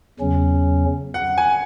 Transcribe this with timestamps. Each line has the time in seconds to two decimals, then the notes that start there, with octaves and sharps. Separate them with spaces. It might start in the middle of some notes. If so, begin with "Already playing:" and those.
0.19 E2 C#3 F#3 C#4
1.14 F#5
1.38 G#5